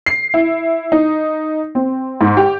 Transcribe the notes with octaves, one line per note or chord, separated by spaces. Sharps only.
C7
E4
D#4
C4
G#2
G4